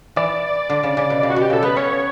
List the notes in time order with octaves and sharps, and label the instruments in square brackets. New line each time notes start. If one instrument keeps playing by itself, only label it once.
[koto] E3 [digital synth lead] D5
[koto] D3
C#3
C#3
B2
C#3
[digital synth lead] F#4
[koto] B2
[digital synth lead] G4
[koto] C#3 [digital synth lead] A4
[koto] B3 [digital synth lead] B4
[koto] C#4 [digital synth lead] C#5